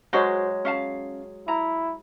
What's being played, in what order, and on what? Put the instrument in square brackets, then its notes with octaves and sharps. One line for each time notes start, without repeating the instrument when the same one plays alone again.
[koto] F#3 G#3 [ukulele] F#4 A#4 C5
[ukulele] C#4 F5 A5
[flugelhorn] E4 [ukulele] A#5